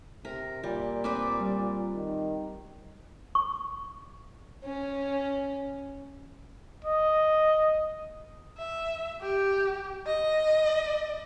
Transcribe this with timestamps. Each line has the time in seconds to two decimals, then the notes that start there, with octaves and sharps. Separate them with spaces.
0.25 C3 A#4
0.64 A#2 G3
1.04 C4 B4 D5 D6 D#6
1.39 G3
1.95 D#3
3.35 C#6
4.65 C#4
6.84 D#5
8.58 E5
9.21 G4
10.07 D#5